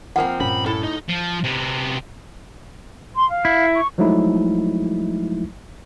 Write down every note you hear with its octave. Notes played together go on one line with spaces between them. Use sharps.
F3 A#3 C4 F#5 G#5
G2 A#2 C#4 B5
A2 A4
D#4
F3
C3 B3
C6
F5
E4
C#6
F3 F#3 G#3 A3 D#4 E4